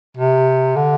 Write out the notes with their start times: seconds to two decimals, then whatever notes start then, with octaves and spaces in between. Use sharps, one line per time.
0.17 C3
0.76 D3